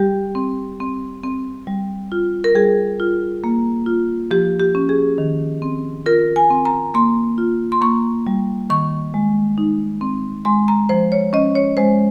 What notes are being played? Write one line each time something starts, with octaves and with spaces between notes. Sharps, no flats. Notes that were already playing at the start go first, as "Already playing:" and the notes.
Already playing: G3 G4
C4
C4
C4
G3
F4
A#4
G3 G#4
F4
A#3
F4
F3 G4
G4
C#4
G#4
D#3
C4
F4 A#4
G#5
C4
A#5
A#3 C6
F4
C6
A#3 C#6
G3
D#3 C#6
G#3
D#4
C4
G#3 C6
A#5
F3 C5
C#5
C#4 D#5
C#5
G#3 C5